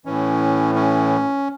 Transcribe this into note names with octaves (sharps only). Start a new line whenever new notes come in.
A2 E3 C#4
C#4